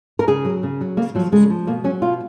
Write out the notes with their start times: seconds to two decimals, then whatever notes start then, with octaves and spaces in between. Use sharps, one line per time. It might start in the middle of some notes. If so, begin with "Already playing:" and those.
0.19 A#4
0.27 C#3 G#4
0.45 F#3
0.63 C#3
0.81 F#3
0.97 C#3 A#3
1.15 F3 F#3
1.32 C#3 G#3
1.50 F3
1.67 B2 A#3
1.84 F#3 C#4
2.02 B2 F4